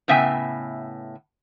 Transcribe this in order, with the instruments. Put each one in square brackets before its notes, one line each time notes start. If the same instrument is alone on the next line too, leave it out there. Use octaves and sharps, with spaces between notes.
[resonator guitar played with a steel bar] A2 C#3 B3 E5 G5 G#5